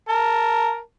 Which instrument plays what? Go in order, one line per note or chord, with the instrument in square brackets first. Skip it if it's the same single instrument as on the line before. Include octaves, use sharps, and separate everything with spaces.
[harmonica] A#4 A5